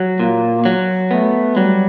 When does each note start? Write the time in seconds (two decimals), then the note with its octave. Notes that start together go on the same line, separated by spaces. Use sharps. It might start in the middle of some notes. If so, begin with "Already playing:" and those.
Already playing: F#3
0.18 A#2 A#3
0.65 F#3
1.11 A3 B3
1.57 F#3 G3